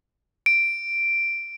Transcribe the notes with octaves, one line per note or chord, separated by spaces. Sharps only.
D7